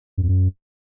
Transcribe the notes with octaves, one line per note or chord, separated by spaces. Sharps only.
F#2
F2
F#2